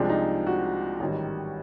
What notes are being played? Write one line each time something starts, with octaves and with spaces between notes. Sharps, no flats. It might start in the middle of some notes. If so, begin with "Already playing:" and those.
Already playing: C2 C3 F3 G#3 D4
D#4
F#4
A1 G#2 D#3 G3